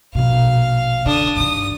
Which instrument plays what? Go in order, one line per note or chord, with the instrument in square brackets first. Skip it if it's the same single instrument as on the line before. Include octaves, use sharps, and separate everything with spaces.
[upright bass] A#1 B2 [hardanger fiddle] F5
[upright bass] D3 [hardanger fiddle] D4 D#6
[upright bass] G2 D#3 [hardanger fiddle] D#6